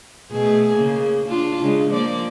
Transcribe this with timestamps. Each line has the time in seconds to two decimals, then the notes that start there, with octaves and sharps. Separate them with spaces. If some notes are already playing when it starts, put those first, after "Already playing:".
0.31 B2 A3 G#4
0.73 C#3 A#3
1.28 D4 F4
1.62 C#3 G#3
1.90 F3 A#3 D5